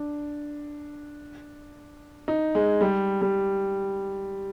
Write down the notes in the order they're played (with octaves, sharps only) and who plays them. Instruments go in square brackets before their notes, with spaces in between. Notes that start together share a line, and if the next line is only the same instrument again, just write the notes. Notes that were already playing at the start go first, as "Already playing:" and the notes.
Already playing: [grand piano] D4
D#4
G#3
G3
G3